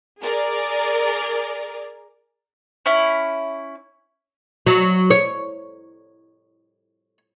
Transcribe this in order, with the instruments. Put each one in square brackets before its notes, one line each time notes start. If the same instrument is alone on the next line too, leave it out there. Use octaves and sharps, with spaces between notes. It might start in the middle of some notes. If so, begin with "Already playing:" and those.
[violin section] G#4 A#4 D5
[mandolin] C#4 E4
[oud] F#3
C#5